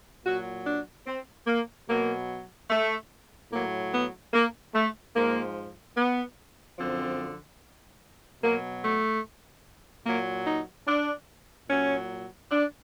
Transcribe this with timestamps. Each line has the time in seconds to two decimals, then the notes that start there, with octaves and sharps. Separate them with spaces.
0.25 A#2 F#3 F#4
0.65 D4
1.06 C4
1.47 A#3
1.88 B2 F#3 A#3
2.70 A3
3.51 A2 F#3 A#3
3.92 B3
4.33 A#3
4.74 A3
5.15 G#2 F3 A#3
5.96 B3
6.78 F#2 D3 F3 C4
8.42 B2 F#3 A#3
8.83 A3
10.05 A#2 F#3 A#3
10.47 D#4
10.87 D4
11.68 A#2 F#3 C#4
12.51 D4